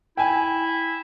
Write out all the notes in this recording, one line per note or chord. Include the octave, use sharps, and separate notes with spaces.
E4 G5 G#5